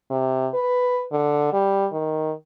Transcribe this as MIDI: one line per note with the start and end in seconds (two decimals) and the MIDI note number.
0.10 0.48 48
0.54 1.03 71
1.12 1.49 50
1.53 1.87 55
1.92 2.32 51